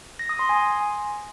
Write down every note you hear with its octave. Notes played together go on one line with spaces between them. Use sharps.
A#6
D#6
C6
G#5